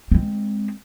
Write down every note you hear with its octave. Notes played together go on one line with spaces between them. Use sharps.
G#3 C4